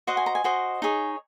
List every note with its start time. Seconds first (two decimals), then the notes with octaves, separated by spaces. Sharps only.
0.07 F#4 C5 D#5 F#5
0.17 G#5
0.26 A#5
0.35 G#5
0.44 F#4 C5 D#5
0.82 D#4 G#4 C#5